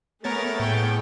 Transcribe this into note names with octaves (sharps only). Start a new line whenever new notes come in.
A3 B3 G#4 A#4 C#5 A6
A2 G5